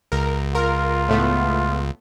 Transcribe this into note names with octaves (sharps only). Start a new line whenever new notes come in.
C#2 A#4
F4 A#4
A2 A3 B3